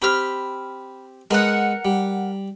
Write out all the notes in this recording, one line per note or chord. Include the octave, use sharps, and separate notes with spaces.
C4 G4 B5 F6
G#3 B3 A#4 F#5
G3